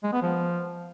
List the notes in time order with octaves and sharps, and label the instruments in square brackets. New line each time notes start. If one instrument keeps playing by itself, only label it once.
[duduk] G#3
B3
F3